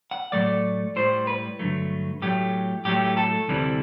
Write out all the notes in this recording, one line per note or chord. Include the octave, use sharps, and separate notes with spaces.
F#5
A2 F#3 A3 D5
A2 G3 C5
B4
G2 D3 F#3 A3
A2 F#3 A3 G4
A2 F#3 A3 G4
A4
D2 C3 E3 G3